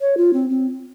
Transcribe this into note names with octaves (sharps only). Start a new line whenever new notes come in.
C#5
F4
C4
C4